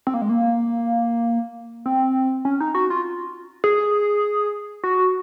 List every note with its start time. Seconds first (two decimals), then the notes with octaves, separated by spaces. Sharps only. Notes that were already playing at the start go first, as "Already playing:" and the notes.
0.07 C4
0.14 A#3
0.21 G#3
0.29 A#3
1.86 C4
2.45 C#4
2.61 D#4
2.75 F#4
2.90 F4
3.64 G#4
4.84 F#4